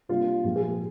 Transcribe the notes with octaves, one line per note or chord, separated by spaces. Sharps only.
C3 G3 A#3 D4 F4
A#2 F3 G#3 G4
G#4
G4